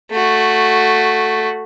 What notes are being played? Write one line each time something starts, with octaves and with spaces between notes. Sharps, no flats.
A3 F#4